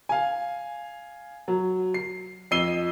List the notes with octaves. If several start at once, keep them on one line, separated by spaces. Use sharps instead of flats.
F5 G#5
F#3
C7
F2 D#5 E6 C7 D#7 G7